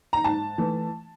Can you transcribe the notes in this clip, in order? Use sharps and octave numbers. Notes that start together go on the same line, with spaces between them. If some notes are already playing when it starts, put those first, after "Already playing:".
A#5
G#2 A5
E3 A3